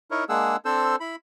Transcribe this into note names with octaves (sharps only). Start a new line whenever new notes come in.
D#4 E4 A#4 C#5
G#3 A#3 D4 G#4 F#5 E6
C4 D4 A4 C5 E6
E4 B5